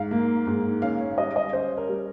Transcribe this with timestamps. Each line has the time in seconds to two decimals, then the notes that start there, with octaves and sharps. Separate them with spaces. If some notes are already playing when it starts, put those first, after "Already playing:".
Already playing: G#2 F5
0.11 A#3
0.47 G#2
0.82 C#4 F5
1.00 C#5
1.11 F5
1.18 G3 D#5
1.36 D#5
1.53 C#4 C5
1.77 A#4
1.89 G3